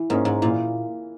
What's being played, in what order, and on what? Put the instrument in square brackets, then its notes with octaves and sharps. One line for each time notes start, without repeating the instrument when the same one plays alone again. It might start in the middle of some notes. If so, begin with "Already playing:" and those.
Already playing: [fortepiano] E3
[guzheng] G#2 [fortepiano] A#3 C#4
[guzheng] G#2
[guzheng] A#2 [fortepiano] E3